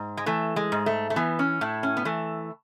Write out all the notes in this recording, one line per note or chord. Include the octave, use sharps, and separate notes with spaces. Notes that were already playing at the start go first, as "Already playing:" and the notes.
Already playing: G#2
G#3
E3 A3
G#3
G#2
A3
A3
E3 B3
C#4
A2 E4
C#4
B3
E3 A3